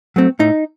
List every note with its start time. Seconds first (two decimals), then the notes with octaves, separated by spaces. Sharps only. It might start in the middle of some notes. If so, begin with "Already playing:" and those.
0.16 F#3 A3 C4
0.39 A2 D#4